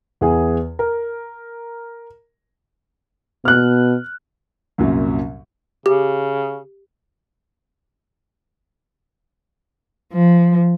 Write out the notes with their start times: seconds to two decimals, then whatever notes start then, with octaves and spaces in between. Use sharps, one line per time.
0.21 E2 E3 G#4 G#5
0.79 A#4
3.45 B2 F6 F#6
4.78 C2 F#2 A#2 F#3
5.86 C#3 G4
10.12 F3